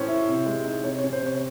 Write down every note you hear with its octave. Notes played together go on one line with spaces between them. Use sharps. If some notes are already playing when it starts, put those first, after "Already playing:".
Already playing: A2 C#4 C5
E4
C3
G#3
D#4
C3 C#5
C#5
C#4
C5
C3 C#5